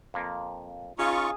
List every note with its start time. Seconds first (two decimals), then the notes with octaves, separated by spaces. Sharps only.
0.14 F2 A#3
0.99 C#4 D#4 F4 G#4 F5 C#6